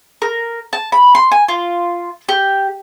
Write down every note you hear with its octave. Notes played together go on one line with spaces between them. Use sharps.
A#4
A5
B5
C6
G#5
F4
G4